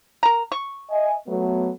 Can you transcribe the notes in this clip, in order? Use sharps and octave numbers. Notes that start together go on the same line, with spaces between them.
A#4 A#5
C#6
D#5 E5 G#5
F#3 A3 B3